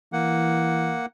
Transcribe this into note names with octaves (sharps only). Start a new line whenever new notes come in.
E3 A#3 F#5